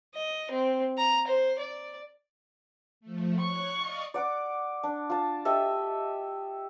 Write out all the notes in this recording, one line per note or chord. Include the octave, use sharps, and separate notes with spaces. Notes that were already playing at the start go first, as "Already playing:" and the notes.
D#5
C4
A#5
C5
D5
F3 A3
C#5 C#6 F#6
D5 D#5 F5
D5 F#5 D6
D4
F4 A5
G4 A4 D#5 E5